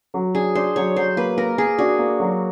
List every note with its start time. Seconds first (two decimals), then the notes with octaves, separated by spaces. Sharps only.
0.14 F#3
0.34 D4 G#4
0.55 D4 C5
0.76 F#3 C#5
0.96 F#3 C5
1.17 A#3 B4
1.37 A#3 A#4
1.58 A#3 G#4
1.78 D4 F#4
1.99 A#3
2.20 F#3